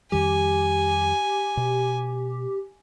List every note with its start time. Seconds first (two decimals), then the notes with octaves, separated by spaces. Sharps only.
0.12 F2 D#3 G3 G4 G#5
1.57 B2